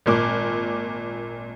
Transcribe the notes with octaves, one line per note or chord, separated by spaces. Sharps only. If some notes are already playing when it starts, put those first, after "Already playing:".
G#1 A#2 D6